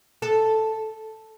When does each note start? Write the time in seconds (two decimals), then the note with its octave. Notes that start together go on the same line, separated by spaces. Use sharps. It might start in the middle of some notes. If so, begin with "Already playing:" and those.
0.22 A4